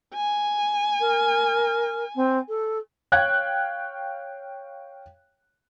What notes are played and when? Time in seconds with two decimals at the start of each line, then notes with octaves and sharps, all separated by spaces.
0.14 G#5
1.00 A#4
2.15 C4
2.48 A4
3.12 C#5 F5 G5 F#6 G#6